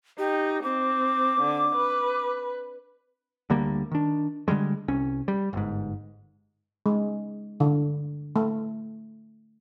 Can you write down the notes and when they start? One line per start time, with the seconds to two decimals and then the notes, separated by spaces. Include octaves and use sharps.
0.18 D#4 G4
0.63 C4 D6
1.41 D3
1.75 B4
3.50 D2 D3 G3 A#3
3.91 D#3 D4
4.48 D3 D#3 G3 G#3
4.88 C2 C#4
5.28 G3
5.53 G1 G#2
6.86 G#3
7.60 D3
8.36 A3